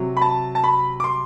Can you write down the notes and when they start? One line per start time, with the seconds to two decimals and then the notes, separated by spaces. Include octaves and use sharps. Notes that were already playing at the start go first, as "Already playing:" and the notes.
Already playing: C3 F#3
0.17 B5
0.22 A5
0.55 A5
0.64 B5
1.00 D6
1.04 C6